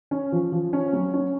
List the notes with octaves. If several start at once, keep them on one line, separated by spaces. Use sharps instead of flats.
C#4
F3
F3
C#4
F#3
C#4